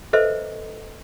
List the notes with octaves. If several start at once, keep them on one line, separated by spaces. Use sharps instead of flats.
A4 B4 C5 D#5 E5